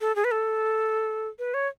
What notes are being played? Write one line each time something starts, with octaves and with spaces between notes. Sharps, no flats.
A4
G#4
B4
A4
B4
C#5